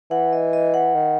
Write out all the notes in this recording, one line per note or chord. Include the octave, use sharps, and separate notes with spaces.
E3 F#5
D#5
D#5
F#5
D#3